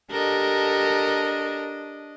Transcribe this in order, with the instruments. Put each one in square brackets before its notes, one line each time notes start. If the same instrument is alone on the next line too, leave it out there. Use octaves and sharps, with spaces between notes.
[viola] D4 D#5 [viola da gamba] G4 A4 A#4